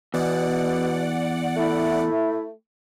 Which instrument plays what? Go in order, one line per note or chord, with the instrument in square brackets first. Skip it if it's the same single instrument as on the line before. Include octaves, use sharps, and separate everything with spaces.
[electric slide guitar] E2 [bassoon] B2 [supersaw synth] D5 F#5
[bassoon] A3 [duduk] E4